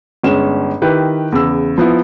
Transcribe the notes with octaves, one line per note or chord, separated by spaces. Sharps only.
G1 G#3 C#4 E7
D#3 E4 G4 B4
E2 C#3 E6
F3 B3 E4